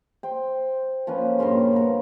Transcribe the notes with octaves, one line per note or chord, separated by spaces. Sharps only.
C5 G5
F3 A#3 C#4 B4
G2 A#2 C#3 C6
B3 A#4